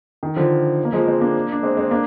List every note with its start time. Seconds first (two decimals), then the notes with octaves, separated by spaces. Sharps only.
0.23 D#3
0.36 D3 F3
0.85 A#3
0.93 F3 G#3
1.07 G#3 C4
1.21 A#3 D4
1.52 D4
1.63 G#3 C4
1.77 G#3 C4
1.91 A#3 D4